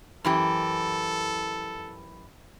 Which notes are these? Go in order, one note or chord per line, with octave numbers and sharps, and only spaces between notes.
F#2 E3 G4 A4